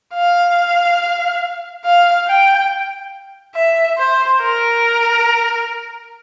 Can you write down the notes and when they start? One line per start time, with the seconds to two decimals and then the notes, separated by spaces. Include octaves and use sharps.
0.15 F5
1.85 F5
2.28 G5
3.55 E5
3.98 C5
4.41 A#4